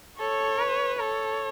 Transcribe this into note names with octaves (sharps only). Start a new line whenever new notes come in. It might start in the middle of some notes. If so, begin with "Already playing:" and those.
A4 C#5
B4
A4 C#5